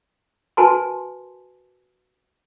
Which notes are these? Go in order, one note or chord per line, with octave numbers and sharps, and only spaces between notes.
F#4 A#4 B4 G#5 A5 C6